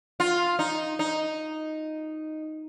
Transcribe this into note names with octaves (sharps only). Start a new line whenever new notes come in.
F4
D#4
D#4